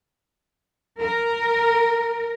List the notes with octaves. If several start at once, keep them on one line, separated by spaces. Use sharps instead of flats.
A#4